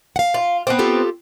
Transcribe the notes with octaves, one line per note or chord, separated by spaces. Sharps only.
F5 F#5
F4
B3 C4
F4 G4 A4